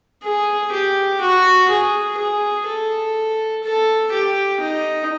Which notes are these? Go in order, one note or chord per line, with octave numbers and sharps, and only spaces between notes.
G#4
G4
F#4
G#4
G#4
A4
A4
G4
D#4